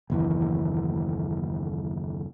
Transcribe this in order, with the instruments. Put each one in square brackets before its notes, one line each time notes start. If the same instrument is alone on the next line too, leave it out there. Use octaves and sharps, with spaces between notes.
[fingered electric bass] F#1 D#2 E3